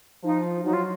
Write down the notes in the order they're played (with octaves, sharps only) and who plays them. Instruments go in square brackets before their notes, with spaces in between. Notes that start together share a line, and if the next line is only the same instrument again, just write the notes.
[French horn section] F3 F4 [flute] D#4
[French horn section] F#3 F#4 [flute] D#4
[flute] F4